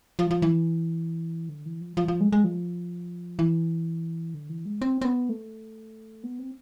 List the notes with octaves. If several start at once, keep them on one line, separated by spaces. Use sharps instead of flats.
F3
F3
E3
D3
E3
F3
F3
F3
G#3
G#3
F3
E3
D3
E3
G#3
C4
C4
B3
A3
B3
C4